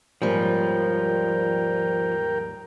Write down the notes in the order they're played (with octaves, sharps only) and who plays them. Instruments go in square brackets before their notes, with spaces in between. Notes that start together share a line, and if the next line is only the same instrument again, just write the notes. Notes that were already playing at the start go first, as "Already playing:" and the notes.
[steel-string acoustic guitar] D#2 G#2 G3 [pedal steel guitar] F3 [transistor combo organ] A#4 G5